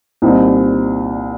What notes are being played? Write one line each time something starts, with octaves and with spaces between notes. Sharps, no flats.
C2 A#2 G3 C4 D#4